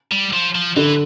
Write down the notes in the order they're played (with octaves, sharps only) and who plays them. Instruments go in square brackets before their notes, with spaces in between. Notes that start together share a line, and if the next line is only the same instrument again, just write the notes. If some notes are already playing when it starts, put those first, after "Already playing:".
[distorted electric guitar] G3
F3
F3
[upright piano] D3 [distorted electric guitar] E3